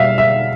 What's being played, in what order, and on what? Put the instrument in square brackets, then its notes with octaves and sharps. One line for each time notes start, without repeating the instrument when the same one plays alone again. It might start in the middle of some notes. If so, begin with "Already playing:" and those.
Already playing: [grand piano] B2 G3 E5 F5
E5